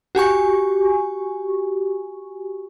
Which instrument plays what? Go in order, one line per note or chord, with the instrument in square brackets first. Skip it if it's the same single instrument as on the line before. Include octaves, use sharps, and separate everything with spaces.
[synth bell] F#4 G4 G#5 C#6